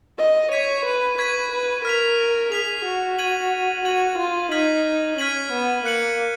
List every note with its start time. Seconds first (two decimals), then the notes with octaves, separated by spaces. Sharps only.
0.18 D#5
0.52 C#5 C#6 G#6 B6 D#7
0.85 B4
1.18 B4 C#6 G#6 B6 D#7
1.52 B4
1.85 A#4 F6 B6 F7
2.52 G#4 F6 B6 F7
2.85 F#4
3.18 G#6 D#7 F#7
3.85 F#4 G#6 D#7 F#7
4.18 F4
4.51 D#4 F6 G#6 B6 D#7 F#7
5.18 C#4 F6 G#6 B6 D#7 F#7
5.52 B3
5.85 A#3 F#6 C#7 F#7